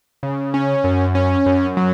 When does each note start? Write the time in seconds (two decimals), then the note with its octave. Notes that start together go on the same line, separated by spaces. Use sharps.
0.23 C#3
0.54 C#4
0.84 F#2
1.15 C#4
1.46 F#2
1.77 F#3